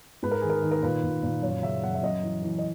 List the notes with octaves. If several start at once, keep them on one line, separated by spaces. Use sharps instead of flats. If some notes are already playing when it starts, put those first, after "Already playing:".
G#2 B4
A#4
D#3 G#4
A#4
D#3
A#4
A#2 B4
A#2
A#2
F#2 C#5
C#3 E5
F#2 F#5
E5
F#2 D#5
E3
E3
D#5